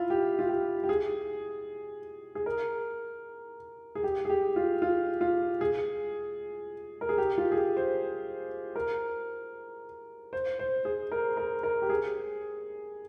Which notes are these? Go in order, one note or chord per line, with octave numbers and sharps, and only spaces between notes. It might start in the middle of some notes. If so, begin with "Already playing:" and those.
Already playing: E4 F4
G4
F4
G4
G4
G#4
G#4
A#4
G#4
G4
G#4
G4
F4
F4
F4
G#4
A#4
G#4
G4
F4
G#4
G4
C5
A#4
C5
C5
G#4
A#4
A#4
A#4
G4
G#4